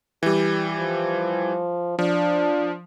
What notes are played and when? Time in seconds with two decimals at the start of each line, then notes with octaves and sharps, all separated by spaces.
0.23 E3 G3 G4
0.78 F3
1.99 F3 D4